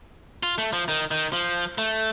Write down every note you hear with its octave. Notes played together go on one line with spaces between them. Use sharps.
F4
A3
F3
D#3
D#3
F3
A3